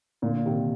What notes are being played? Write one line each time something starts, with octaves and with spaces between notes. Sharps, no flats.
A#2 D3
C3 D#3